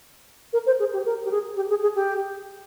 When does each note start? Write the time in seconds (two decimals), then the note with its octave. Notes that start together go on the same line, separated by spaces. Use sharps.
0.53 A#4
0.66 C5
0.79 G#4
0.92 G4
1.05 A#4
1.25 G4
1.31 G#4
1.56 G4
1.69 G#4
1.82 G#4
1.95 G4